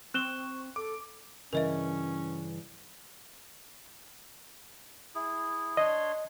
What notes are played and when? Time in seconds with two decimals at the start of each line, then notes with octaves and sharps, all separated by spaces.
0.14 C4 C#6 F#6 E7 G7
0.76 A4 D6
1.53 G2 C#3 E3 C#4 A#4 D#5 E5
5.15 E4 G#4
5.77 D4 C#5 D#5 C6